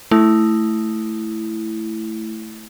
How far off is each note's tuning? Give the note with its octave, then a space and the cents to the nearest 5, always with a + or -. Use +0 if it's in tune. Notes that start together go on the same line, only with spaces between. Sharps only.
A3 +0 E4 +0